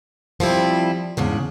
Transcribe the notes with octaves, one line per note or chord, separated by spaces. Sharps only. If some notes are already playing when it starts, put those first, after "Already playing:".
F3 G3 C4 E4
E2 G#2 C#3 D4